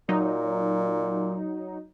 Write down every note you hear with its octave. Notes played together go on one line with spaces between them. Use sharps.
A#2 F#3 D#4